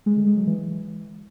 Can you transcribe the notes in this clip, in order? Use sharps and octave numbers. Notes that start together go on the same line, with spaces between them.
G#3
D3
G#3
F#3
E3